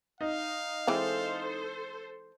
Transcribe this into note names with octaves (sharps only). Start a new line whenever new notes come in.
D#4 F5
E3 G#3 C4 A4 C5